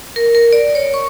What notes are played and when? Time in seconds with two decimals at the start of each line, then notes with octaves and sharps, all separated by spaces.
0.16 A#4
0.35 A#4
0.53 D5
0.75 C#5
0.94 C#6